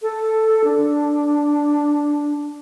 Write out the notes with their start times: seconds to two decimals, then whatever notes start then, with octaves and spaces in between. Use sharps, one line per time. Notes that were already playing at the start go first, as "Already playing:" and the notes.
0.02 A4
0.64 D4